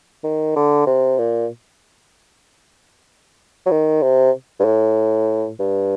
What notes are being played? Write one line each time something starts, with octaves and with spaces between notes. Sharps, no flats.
D#3
D3
C3
A#2
F#3
D#3
C3
G2
A2
G2